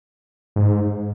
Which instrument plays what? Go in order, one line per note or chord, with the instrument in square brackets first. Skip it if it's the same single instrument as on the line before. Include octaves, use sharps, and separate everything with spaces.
[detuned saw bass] G#2